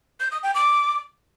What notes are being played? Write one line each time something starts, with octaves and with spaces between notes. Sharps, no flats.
G6
D#6
G5
D6